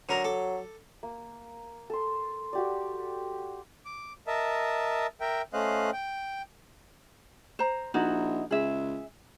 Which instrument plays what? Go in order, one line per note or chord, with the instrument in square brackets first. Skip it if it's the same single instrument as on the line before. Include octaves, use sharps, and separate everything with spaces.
[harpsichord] D3 A#4 A#5 [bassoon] F#3
[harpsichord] A4 D6
[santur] A#3
A4 C6
F#4 G4 D5
[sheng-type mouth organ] D6
A#4 D#5 E5 A5
A#4 E5 G5
A3 C#4 C5 D#5 F5 F#6
G5
[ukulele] C5 A#5
[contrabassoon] A#1 [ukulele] D#4 E4 F#4
[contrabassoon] C#2 [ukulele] G#4 E5